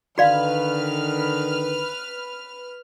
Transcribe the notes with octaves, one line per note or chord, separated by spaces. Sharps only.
D3 D#3 F#4 B4 D5 F5 F6